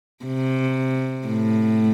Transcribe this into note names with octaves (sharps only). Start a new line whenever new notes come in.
C3
A2